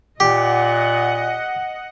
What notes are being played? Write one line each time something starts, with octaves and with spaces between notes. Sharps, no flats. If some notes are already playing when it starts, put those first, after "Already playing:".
A#2 G4 D#5 F#5